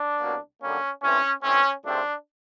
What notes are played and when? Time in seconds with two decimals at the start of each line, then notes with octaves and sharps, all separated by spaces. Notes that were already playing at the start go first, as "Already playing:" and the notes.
Already playing: D4
0.20 C2 B2 F#3 A#3
0.60 F#2 D3 G3 A#3 C#4
1.02 G2 E3 A3 C4 C#4
1.43 G2 E3 A3 C4 C#4
1.84 C#2 C3 F3 A3 C4 D4